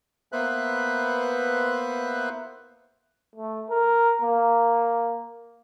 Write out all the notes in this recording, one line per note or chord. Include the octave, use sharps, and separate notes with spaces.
A#3 B3 B4 C5 E5 F#6
A3
A#4
A#3